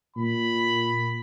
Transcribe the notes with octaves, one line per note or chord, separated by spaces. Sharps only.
A#2 B5